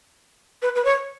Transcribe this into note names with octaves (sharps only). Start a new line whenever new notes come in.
B4
B4
C#5